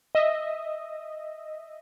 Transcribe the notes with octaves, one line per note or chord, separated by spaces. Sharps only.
D#5 E5